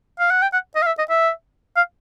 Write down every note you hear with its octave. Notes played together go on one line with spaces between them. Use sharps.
F5
F#5
G5
F#5
D#5
F5
E5
D#5
E5
F5